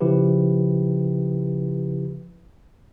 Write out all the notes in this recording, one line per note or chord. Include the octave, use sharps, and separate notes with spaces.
C#3 F3 E4 G4 B4